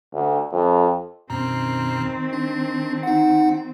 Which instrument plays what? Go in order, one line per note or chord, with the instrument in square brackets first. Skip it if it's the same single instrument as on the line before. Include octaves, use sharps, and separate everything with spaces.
[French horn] D2
F2
[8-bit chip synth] F#2 B2 A#5 [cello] D#3 C4
[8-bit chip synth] D4
D#4 F#5